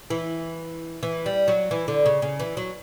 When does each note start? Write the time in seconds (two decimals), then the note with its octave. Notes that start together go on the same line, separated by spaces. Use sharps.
0.10 E3
1.03 E3
1.26 G3
1.48 F#3
1.71 E3
1.88 D3
2.06 C#3
2.22 C#3
2.40 E3
2.57 F#3